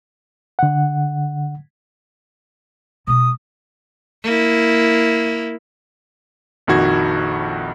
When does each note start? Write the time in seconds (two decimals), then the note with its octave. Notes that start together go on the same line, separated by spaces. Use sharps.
0.59 D3 F#5
3.07 B2 G#3 D#6
4.24 A#3 E4
6.67 A#1 F2 D#3 F#4 G#6